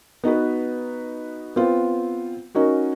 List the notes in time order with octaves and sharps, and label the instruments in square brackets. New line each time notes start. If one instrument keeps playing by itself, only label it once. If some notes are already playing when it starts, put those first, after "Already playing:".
[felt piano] B3 D#4 F#4 B4
B3 C4 F4
C#4 D#4 F#4 A#4